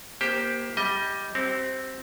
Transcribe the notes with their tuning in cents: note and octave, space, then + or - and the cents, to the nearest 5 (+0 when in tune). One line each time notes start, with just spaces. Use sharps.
A#3 +25 G4 +5 C5 +0
G3 +0 D#5 +20
C4 +5 G4 -45